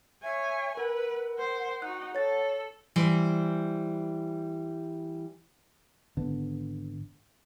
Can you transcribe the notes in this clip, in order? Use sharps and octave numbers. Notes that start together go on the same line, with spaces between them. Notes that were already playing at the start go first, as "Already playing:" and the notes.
C#5 E5 G#5
A#4 B4 F#5
C5
D#4 F#4 F#6
A4 C#5 A6
E3 G3 C5
G#1 D3 B3